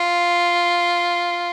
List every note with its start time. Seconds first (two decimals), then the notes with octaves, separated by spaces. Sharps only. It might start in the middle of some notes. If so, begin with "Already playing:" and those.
Already playing: F4